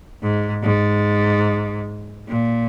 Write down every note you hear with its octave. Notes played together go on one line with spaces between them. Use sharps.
G#2
G#2
A#2